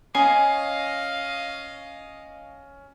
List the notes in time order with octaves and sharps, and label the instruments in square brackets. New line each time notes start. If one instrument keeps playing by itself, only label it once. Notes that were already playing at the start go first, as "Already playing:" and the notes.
[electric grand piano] C#4 C7 [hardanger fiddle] D#5 F5 [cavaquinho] G#5 D#6